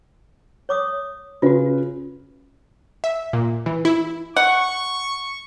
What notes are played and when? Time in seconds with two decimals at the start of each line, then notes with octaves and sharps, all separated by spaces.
0.69 C#5 D6 D#6
1.42 C#3 F4 F#4 B4
3.04 E5
3.33 A#2
3.66 E3
3.85 E4
4.37 F#5 C#6